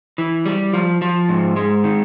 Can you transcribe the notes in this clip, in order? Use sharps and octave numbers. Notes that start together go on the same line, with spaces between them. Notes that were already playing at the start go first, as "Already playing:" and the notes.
E3
G3
F3
F3
G#2
G#3
D#3